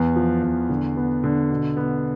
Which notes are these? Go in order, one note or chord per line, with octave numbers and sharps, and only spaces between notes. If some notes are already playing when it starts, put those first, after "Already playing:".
Already playing: E2 B3
F3
E2
D3
B3
D3
B2
B3